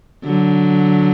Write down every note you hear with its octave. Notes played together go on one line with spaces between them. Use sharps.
D3 F#3